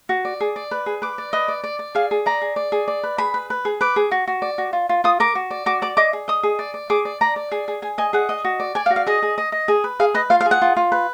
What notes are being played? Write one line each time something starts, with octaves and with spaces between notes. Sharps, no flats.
F#4
D5
G#4
D5
B4
G#4
B4 D6
D5
B4 D#5
D5
D5
D5
G#4 F5
G#4
D5 A#5
G#4
D5
G#4
D5
B4
G#4 B5
B4
B4
G#4
B4 D6
G#4
F#4
F#4
D5
F#4
F4
F4
F4 D#6
A#4 D6
F#4
D5
F#4 D6
D5 D6
D#5 D6
G#4
D#5 D#6
G#4
D5
D5
G#4 D6
D5
D5 A#5
D5
G#4
G#4
G#4 G#5
D#5 G#5
G#4 F#5
D#5
F#4
D5
D5 G#5
F5
F#4
F5
G#4 D#5
G#4
D#5
D#5
G#4
B4
G#4 F5
B4 D#5
F4 F5
F5
G#4
F#5
F4
F4
B4